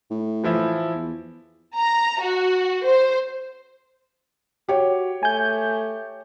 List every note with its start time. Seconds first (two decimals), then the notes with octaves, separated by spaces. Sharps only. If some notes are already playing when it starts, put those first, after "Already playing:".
0.11 A2
0.44 E3 F3 E4
0.95 E2
1.77 A#5
2.22 F#4
2.86 C5
4.69 F#4 G4 C#5
5.23 A3 G#5 G6